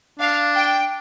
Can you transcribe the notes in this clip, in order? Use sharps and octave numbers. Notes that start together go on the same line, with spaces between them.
D4 F5
G5